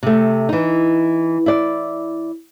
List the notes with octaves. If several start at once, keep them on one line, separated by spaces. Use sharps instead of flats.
C3 A3
E3 D#4
E4 D5